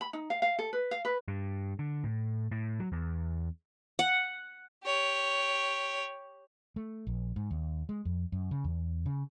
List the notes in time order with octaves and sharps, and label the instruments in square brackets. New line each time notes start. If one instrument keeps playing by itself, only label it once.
[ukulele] B5
D#4
F5
F5
A4
B4
F5
B4
[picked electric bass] G2
D3
A2
A2
F#3
E2
[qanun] F#5
[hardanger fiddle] G4 C#5
[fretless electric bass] A3
A#1
G#2
D#2
G#3
F2
F#2
C#3
E2
C#3